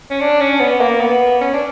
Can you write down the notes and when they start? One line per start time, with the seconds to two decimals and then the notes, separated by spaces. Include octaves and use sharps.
0.10 C#4
0.20 D4
0.41 C#4
0.60 B3
0.81 A#3
1.01 B3
1.41 C#4
1.53 D4